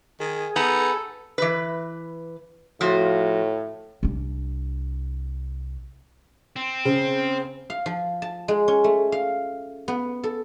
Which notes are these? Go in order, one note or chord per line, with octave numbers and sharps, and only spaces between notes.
D#3 G#4
B3 D#4 A4
E3 B4
A2 F3 F4 F#4
C2 D4
C4
C#3 C5
F5
F3
A5
G#3
C#4
A3
F5
B3
A4